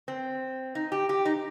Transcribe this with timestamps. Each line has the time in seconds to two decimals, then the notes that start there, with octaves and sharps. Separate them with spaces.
0.08 C4
0.75 D#4
0.92 G4
1.09 G4
1.25 D#4